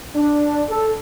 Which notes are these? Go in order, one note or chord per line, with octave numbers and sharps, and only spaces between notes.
D4
A4